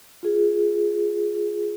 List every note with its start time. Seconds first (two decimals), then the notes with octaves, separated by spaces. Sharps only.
0.23 F4 G#4